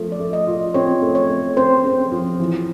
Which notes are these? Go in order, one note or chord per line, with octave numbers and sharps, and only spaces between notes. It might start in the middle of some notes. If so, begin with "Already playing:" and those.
Already playing: F3 A3
D5
A3
D#5
F4
C4 C#5
A3
C#5
A3
C4 C5
C4
F3
E3